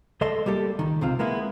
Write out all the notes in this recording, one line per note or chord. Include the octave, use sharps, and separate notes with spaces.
C#2 A3 A4 D#5 C6
G3 A#3 G4 A4
C#2 D#3
B1 C3 C4 F4
G#3 A#3 B3 E4